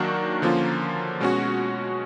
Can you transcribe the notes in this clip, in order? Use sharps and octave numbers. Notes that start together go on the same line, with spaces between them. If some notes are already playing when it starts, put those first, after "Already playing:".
Already playing: D#3 F#3 A#3 D4 F#4
D3 F3 A#3 C#4 F4
B2 G#3 C#4 F#4